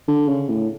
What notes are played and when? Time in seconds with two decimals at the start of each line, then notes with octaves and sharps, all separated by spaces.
0.08 D3
0.28 C#3
0.49 A2